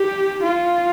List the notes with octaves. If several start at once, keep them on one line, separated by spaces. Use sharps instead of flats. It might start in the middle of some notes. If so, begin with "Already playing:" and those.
Already playing: G4
F4